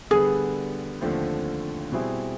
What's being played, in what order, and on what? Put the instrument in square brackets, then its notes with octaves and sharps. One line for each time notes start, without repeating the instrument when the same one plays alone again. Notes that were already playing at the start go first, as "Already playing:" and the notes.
[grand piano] D3 G3 B3 [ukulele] G#4
[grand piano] D#2 D3 F3 A3 C4
B2 G3 C4 E4 G#4